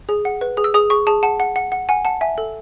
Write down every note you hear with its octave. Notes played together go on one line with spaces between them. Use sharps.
G#4
F#5
B4
G#4
E6
G#4 D#6
G#4 C#6
G#4 A5
F#5 A5
F#5
F#5
F#5
F#5 G#5
F#5 A5
E5 G#5
A4